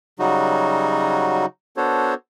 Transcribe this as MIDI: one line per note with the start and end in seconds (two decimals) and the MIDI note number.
0.19 1.46 49
0.19 1.46 54
0.19 1.46 55
0.19 1.46 63
0.19 1.46 66
1.77 2.14 59
1.77 2.14 62
1.77 2.14 66
1.77 2.14 69
1.77 2.14 72
1.77 2.14 73